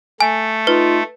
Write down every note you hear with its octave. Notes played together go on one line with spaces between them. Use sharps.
A3 G#5
D#4 F4 B4